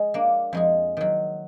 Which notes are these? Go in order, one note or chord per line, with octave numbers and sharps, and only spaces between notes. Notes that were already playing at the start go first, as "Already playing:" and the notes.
Already playing: G#3 G#4
A#3 D4
F2 G#3 G#4
D#3 F#3